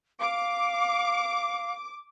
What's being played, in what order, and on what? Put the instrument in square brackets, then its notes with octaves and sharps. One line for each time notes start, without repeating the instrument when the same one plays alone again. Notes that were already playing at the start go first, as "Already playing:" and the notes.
[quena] F5 [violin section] D6